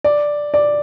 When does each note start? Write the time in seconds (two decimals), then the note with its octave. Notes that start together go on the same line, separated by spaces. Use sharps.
0.04 D5
0.54 D5